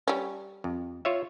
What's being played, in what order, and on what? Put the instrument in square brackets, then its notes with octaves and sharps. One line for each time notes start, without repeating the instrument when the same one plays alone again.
[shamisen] G3 C#4
[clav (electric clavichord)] F2
F4 C#5 E5